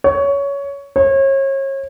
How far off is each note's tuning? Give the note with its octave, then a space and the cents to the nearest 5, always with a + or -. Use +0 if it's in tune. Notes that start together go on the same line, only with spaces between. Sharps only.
C#5 +15
C#5 -35